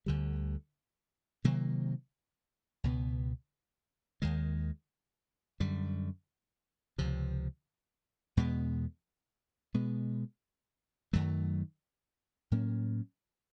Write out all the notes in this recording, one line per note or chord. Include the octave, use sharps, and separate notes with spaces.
D2 D3 G3
C3 D#3 F#3 A#3
C#2 B2 G3 B3
D#2 D#3 G#3
F#2 D3 G3
C#2 C3 F3
E2 B2 G#3 B3
B2 G#3 B3
F#2 D#3 F#3 A3
A2 F#3 A#3 C#4